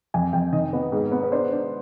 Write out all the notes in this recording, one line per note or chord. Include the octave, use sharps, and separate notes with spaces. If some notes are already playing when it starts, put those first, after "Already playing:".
F2 G#5
F2 G5
D#3 D#5
B3
G#2
B3
B4
D4 C5
D4